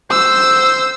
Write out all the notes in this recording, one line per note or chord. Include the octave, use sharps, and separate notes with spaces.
C5 E6